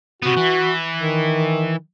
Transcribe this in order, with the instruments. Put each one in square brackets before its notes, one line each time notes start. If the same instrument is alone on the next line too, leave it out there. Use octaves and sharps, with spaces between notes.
[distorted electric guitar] C3 B3 [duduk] F#4
[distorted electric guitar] E3
[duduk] D#3